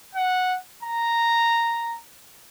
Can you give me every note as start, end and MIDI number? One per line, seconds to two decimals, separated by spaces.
0.15 0.57 78
0.83 1.96 82